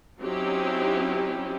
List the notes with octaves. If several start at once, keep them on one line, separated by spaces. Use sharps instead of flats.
F#3 C4 C#4 D#4 E4 G4